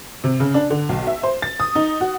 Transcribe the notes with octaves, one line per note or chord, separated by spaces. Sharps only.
C3
C#3
D4
D3
B1
E5
C5
A6
D#6
D#4
F#4